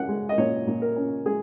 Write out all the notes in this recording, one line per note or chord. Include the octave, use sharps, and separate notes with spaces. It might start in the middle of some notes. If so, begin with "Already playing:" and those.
Already playing: C#4 F#5
G#3
D#5
A#2 C#5
A#2
A#4
C#4
G#3 G#4